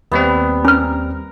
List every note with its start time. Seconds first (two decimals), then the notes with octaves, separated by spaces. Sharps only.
0.12 D#2 G3 B3 C4
0.65 C#4 A#4 F6